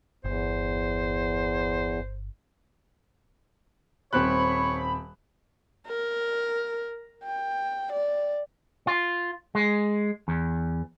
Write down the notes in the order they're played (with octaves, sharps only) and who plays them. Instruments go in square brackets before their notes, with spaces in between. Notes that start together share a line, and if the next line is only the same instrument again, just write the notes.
[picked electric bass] G1 [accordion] E2 [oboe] C5
[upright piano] D#1 C4 F#6 [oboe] C#5 [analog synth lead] B5
[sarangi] A#4
G5
D5
[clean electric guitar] F4
G#3
E2